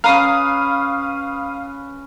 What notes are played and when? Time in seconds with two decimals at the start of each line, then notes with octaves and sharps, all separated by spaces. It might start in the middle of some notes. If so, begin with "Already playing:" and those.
0.04 C#4 B4 F5 A#5 D#6